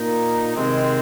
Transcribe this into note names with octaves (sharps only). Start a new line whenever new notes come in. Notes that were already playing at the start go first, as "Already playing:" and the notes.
Already playing: A#2 A#3 D#4
C3 D#3 G#3 C4